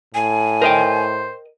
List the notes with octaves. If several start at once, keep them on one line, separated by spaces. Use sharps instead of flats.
A2 G#5
A#4 C5 D#5 G5